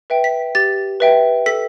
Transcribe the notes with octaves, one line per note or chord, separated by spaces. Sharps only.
B4 E5 G5
B6
G4 A6
B4 E5 G5
A4 B6